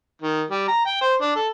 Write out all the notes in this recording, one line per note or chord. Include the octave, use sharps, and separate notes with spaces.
D#3
G3
A#5
G5
C5
D4
A4